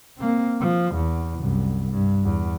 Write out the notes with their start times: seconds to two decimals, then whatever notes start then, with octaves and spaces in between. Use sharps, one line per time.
0.18 A#3 C4
0.60 F3
0.95 E2
1.39 C2 F#2
1.90 G2
2.24 E2